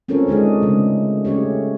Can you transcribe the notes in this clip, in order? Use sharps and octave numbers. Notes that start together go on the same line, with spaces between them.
C4 C#4 F4 A4 A#4 C#5
G#3 D4 D#4 G#4
C#3 G#3 A3
A3 C#4 G4 C#5